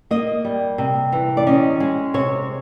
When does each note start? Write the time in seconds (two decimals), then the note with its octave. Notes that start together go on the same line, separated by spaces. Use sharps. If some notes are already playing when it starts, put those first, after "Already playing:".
0.11 A#3 D#5
0.45 G3
0.78 C3
1.12 E3
1.37 D5
1.47 C#4 D#5
1.80 G#3
2.14 C3 C#5